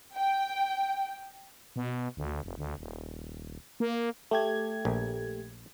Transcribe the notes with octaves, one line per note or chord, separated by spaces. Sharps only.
G5
B2
D2
F1
D2
D#1
A#3
A3 G4 G#6
A#1